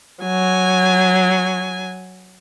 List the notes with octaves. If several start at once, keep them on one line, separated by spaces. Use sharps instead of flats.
F#3 G#5